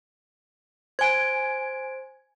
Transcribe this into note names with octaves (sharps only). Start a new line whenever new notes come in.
C5 G#5 G#6 D7